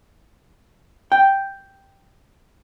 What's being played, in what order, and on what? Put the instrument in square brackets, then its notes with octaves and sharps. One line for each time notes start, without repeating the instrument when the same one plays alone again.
[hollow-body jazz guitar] G5